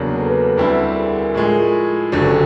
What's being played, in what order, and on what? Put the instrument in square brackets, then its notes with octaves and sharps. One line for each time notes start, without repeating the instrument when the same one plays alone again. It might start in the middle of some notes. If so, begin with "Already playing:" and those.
Already playing: [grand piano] E2 C#3 F#3 A#3 D4
[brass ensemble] A4 B4
[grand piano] D2 D3 G3 C4 E4
[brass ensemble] G#4 A#4
[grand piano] A2 F3 G#3
[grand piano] F#1 F#2 D3 [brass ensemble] G4 A4